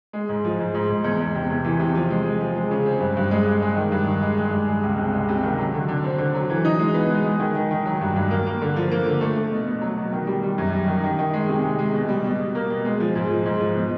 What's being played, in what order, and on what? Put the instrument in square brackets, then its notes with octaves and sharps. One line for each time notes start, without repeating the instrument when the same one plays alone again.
[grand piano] G#3
G#2
F3
G#2
G#2
G#2
E2
E2
C3
E2
E3
C3
F3
G#3
G#3
F3
G#3
C#3
C4
G2
G2
G#3
G#3
G#3
D#3
G2
D#3
G#3
G#3
G2
G#3
C#2
C3
G#3
C3
D#3
F#3
D3
D3
C4
D3
F#3
E3
D#4
G#3
B3
G#3
G#3
D#3
D#3
D#3
F#3
G2
G2
A#3
A#3
D3
F3
A#3
D3
A3
A3
B2
B2
F#3
B2
D#3
G3
G3
F#2
G3
D#3
D#3
D#3
G#3
C3
G#3
G#3
B2
G3
B2
B2
A#3
B2
G#3
F3
G#2
F3
G#2
F3
B2